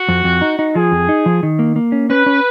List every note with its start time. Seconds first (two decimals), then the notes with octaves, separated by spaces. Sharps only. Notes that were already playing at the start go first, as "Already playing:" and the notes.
Already playing: F#4
0.09 F2
0.24 F2
0.42 D#4
0.59 D#4
0.75 F3 G#4
0.92 F2
1.09 D#4
1.26 F3
1.43 D#3
1.59 A#3
1.76 A#3
1.92 C#4
2.10 C#4 B4
2.26 C#4